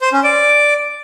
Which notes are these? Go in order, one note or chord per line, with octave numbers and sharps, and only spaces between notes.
C5
C#4
D5